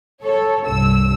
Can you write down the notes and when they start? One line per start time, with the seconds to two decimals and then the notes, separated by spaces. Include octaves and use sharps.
0.23 A4 C#5
0.67 C2 G2 E6